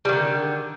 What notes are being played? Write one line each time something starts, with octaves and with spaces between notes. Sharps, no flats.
D3 D#3 G3